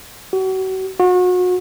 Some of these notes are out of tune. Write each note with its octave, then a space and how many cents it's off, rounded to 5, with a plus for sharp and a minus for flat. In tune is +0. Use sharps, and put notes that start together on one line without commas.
F#4 +35
F#4 -35